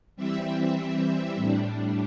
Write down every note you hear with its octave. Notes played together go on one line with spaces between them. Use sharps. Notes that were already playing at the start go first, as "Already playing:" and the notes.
E3 G3 C4 E5
E5
A2 G3 D4